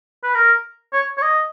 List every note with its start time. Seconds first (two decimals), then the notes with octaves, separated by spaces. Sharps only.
0.23 B4
0.35 A#4
0.93 C#5
1.18 C#5
1.22 D#5